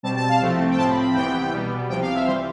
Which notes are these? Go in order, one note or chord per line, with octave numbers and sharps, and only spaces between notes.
B2 G3 C4 A5
A5
F5
C2 C3 F3 A3 C4
G5
A2 F3 C4 A5
B5
B5
C2 C3 E3 B3 G5
B2 G3 B3
C2 C3 F3 G5
F5
E5
E3 G3 C5